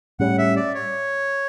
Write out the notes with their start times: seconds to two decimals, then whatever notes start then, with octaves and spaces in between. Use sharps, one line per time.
0.19 A2 G3 C#4 F#5
0.38 E5
0.56 D5
0.74 C#5